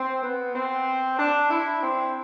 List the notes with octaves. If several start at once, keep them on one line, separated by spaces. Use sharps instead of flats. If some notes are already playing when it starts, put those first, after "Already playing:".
Already playing: C4
B3
C4
D4
E4
C4